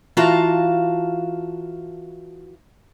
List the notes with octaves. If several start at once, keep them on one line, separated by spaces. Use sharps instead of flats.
E3 F4 F#4 F5 A5 A#5